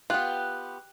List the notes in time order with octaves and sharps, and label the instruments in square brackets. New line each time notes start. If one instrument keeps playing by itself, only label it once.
[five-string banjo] B3 F4 [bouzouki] G4 [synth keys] F#6